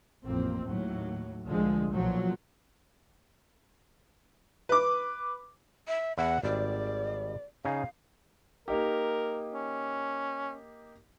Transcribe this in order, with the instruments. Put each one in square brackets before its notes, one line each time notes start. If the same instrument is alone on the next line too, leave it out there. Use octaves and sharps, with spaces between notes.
[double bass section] A1 F2 A#3 C4
D#2 A2 F#3
C2 D3 F3 G#3
B1 A#2 F3 F#3
[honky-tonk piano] B4 D6
[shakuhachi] E5
[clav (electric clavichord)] E2 E4 [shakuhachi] F#5
[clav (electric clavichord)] G#1 G3 [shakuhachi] D5
[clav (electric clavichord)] C#3 D#4 G#4 [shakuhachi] F5
[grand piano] A#3 D#4 G4 [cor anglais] A#4
[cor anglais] C#4